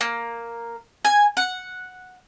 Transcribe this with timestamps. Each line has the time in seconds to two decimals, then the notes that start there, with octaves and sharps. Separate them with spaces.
0.01 A#3
1.05 G#5
1.37 F#5